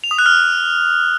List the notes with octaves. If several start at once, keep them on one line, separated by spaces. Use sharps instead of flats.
F7
D#6
F#6
F6